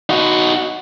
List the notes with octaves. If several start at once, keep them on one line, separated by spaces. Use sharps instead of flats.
D#4 F#4